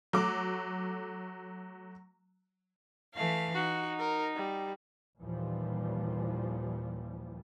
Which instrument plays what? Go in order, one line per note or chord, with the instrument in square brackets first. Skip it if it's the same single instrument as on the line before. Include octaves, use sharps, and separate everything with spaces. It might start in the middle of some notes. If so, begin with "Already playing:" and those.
[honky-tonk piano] F#3 A3 D6
[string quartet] E3 A3 F5
[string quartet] D#4 [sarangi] F#4
[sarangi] A#4
G3
[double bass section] D#2 A#2 E3 F3 G3